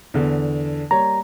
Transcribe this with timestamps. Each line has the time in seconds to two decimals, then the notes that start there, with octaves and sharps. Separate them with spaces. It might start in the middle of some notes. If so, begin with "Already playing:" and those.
0.14 E2 D3
0.91 G3 A#3 C#5 A#5